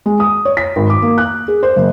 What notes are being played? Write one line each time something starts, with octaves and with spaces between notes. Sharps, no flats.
G#3
D#6
C#5
B6
G#1
D6
A#3
F#6
G#4
C5
F#1